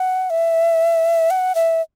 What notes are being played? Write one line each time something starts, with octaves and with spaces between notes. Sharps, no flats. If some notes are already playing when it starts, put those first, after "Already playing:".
Already playing: F#5
E5
F#5
E5